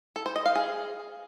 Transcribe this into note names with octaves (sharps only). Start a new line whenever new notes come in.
A4
C5
D#5
F5
G#4